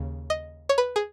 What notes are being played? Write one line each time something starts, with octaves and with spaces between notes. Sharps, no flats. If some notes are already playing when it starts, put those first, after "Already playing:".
Already playing: D#2 C#3
D#5
C#5
B4
G#4